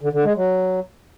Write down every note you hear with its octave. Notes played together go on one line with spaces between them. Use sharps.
D3
D3
G#3
F#3